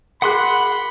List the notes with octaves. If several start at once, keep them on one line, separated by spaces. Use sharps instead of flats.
F#4 G#4 A#4 F#5 B5 C6 F#6